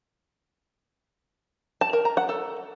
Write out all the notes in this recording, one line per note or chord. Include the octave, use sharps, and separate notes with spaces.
A5
A#4
A#5
F#5
A4